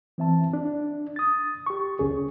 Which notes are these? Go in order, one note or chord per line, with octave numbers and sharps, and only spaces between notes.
E3 C4 E5 A5
D4
D#6 A6
G4 C#6
C#2 C#4 G#4